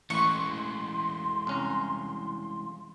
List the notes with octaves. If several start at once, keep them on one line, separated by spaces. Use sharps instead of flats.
A1 E3 G#3 B4 C6 C#6
C2 C#4 A#5